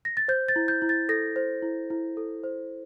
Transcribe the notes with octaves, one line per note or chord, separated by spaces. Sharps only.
A#6
A6
C5 G6
A6
E4
G6
E4
A6
A4 A#6
C5
E4
E4
A4
C5